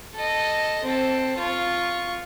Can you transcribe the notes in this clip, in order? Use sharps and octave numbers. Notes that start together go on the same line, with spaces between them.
A4 D#5
C4 A4
F4 C#6